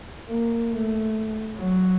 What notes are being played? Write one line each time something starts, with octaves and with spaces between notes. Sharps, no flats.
A#3
A3
F#3